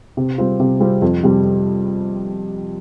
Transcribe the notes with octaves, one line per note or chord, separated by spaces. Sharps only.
C3
G3 C4 F4
C3
G3 C4 F4
F2
C3 G3